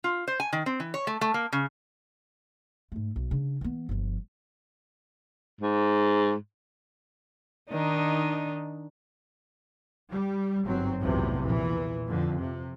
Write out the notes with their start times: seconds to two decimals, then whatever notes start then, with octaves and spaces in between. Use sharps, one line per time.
0.04 F4
0.28 C5
0.40 G#5
0.53 D#3
0.66 C4
0.80 E3
0.94 C#5
1.07 A3
1.21 A3
1.34 A#3
1.53 C#3
2.92 G#2 A3
3.16 B1
3.31 C#3 D4
3.61 E3 B3
3.89 G1 F3
5.61 G#2
7.71 D#3 D4 D#4
10.09 G3
10.64 G1 G#2 F#3 C4
10.99 B1 E2 A2 C3 E3 F3
11.42 E2 A#2 E3
12.05 F2 D3
12.39 C3